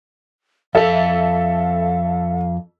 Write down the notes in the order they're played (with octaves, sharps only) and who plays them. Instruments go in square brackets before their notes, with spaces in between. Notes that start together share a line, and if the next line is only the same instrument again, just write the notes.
[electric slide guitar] F2 A5 [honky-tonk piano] A4 E5 [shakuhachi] F5